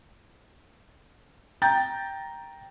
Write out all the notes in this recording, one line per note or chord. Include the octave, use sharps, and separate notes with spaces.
G5 A#5 G6 A6